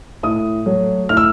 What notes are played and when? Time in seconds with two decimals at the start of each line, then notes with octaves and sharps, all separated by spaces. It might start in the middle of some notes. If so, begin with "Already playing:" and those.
0.23 A2 D#6
0.66 F#3 A3
1.09 A2 F6
1.17 E6